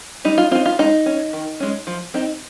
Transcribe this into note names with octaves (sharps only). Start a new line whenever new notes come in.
G3 D#4
F4
C4 D#4 F4
F4
G#3 D#4
C#4
D#3
G#3 C#4
F3
C4 D#4